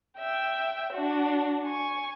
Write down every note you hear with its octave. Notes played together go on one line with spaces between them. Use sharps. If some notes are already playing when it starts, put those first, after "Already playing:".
E5 G5
D4 F#4
G#5 C#6